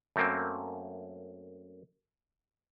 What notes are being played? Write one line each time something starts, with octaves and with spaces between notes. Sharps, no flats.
F#2 A3 A#3 C4